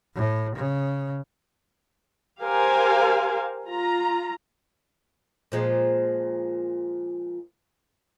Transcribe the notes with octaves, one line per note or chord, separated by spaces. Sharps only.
A2
C#3
G4 A#4 C5 F5 G#5
F4 A#5
A#2 F3 G#3